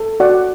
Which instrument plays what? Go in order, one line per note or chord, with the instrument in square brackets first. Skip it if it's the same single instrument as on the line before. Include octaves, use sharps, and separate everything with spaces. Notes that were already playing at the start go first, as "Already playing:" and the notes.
Already playing: [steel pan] A4
F#4 D5 F#5